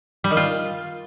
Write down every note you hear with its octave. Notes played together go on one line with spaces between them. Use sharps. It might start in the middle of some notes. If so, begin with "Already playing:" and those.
G3
D#3
F4